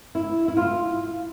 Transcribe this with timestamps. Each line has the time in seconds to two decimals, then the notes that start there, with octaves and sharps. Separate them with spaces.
0.15 E4
0.48 E4
0.57 F4